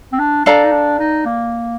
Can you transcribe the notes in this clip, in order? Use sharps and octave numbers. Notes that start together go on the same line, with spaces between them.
C4
D4
D4 A4 D5 F5 A#5
D#4
D4
D#4
A#3